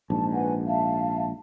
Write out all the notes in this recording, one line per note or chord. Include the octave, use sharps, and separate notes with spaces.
A#1 G#2 A5
B4 F#5 G#5
E5 F5 A5